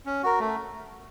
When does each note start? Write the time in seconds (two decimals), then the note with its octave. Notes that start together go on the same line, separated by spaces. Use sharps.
0.06 C#4
0.23 F#4 A#4
0.40 A3